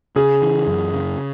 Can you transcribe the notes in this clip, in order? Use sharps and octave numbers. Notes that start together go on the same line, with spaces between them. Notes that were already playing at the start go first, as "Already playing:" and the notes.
C#3 G#4
E3
F#2
C#3